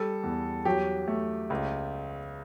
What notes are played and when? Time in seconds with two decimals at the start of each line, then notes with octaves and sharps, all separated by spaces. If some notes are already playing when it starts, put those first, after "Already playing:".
Already playing: G3 A4
0.23 E2
0.65 F#3 G4
1.08 A3
1.50 C#2